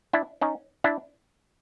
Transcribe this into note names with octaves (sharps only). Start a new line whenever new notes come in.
D4 E4
C#4 D#4
D4 E4